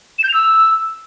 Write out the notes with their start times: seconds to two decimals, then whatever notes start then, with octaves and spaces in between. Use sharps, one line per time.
0.19 E7
0.24 G6
0.29 F7
0.34 E6